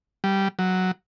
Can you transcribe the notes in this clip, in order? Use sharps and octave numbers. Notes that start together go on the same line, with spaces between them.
G3
F#3